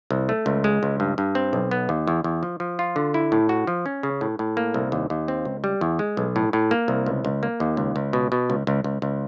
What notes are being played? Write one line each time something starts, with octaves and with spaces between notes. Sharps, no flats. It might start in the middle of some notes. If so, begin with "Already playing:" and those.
C2
A3
C#2
G#3
C#2
G2
G2
C4
B1
B3
D#2
E2
E2
F3
F3
F4
D3
E4
A2
F#4
F3
C#4
C#3
A2
A2
A#3
C2
D#2
D#2
C4
C#2
G3
E2
G#3
B1
A2
A2
A#3
C2
C#2
C#2
A#3
D#2
C#2
C#2
B2
B2
C#2
C#2
C#2
C#2